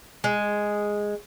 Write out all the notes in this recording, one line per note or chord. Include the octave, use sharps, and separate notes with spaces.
G#3